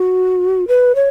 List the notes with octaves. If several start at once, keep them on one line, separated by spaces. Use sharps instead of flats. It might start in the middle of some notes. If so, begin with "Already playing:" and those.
Already playing: F#4
B4
C#5